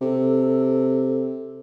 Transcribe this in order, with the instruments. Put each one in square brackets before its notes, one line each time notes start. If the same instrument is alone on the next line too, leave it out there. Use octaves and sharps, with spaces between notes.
[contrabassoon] C3 [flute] A4